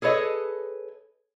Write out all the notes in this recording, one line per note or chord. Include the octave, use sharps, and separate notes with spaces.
G#4 A4 B4 C#5 D#5